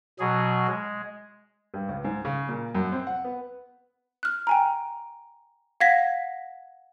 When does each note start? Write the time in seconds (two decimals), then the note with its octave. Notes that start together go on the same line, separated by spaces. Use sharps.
0.20 B2 F#3 G#4
0.68 G#3
1.74 G2
1.89 C#2
2.04 G#2
2.25 C#3
2.49 A#2
2.75 F#2
2.92 C4
3.07 F#5
3.24 B3
4.23 F6 F#6
4.47 G5 G#5 A#5
5.80 F5 F#5 G#6 A#6 B6